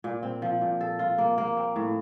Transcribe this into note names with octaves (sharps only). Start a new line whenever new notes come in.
A#2
C4
F3
A#2
A4
F4
A#3
A#3
C4
A2